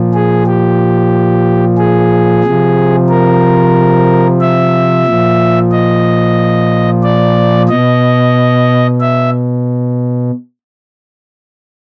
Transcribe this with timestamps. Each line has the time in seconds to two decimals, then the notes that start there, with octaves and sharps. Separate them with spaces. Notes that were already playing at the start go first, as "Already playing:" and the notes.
Already playing: A#2 F3
0.14 G#4
0.47 G4
1.78 G#4
2.44 C3 F3
3.09 A#4
4.40 E5
5.06 A#2 F3
5.72 D#5
7.03 D5
7.69 B2 D#5
9.00 E5